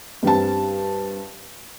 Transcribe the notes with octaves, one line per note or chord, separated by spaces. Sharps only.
G2 G3 C4 A5